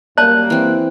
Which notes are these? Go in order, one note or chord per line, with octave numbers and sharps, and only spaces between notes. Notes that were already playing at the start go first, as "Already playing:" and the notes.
F#2 G3 A#3 C#5 D5 A5 F#6
E3 C4